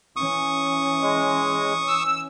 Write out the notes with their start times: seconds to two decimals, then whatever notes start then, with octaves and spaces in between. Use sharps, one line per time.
0.16 E3 C#4 C#6 D#6
1.02 G#3
1.88 E6